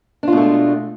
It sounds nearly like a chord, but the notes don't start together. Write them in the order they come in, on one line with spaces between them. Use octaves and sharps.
D4 F4 B2 A3 G#3